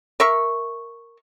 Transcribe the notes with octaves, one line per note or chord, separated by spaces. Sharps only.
A#4 E5 C#6